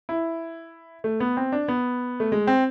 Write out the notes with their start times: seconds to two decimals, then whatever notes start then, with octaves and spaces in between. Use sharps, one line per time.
0.09 E4
1.04 A3
1.20 B3
1.37 C4
1.52 D4
1.68 B3
2.20 A3
2.32 G#3
2.47 C4